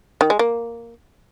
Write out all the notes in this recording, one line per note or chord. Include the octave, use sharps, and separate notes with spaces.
D#3
G#3
A#3